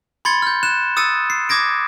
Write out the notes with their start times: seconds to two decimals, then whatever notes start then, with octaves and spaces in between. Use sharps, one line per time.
0.25 B5 C6 G#6 A6 C#7 G7
0.42 F6 G6
0.63 F#6 E7
0.97 D#6 E6 A6 C#7 D#7
1.30 C7
1.49 D6 D#6 G#6 A#6 D7